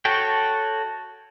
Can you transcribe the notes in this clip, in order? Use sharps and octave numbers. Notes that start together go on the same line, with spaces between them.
F#4 A4 C#5 G5